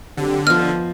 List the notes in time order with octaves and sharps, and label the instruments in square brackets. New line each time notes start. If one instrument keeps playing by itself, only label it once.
[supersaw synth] D3 [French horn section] F#3 C4 G4
[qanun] F3 D#5 [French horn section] B3 [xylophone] F6